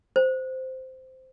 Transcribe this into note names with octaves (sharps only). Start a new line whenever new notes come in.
C5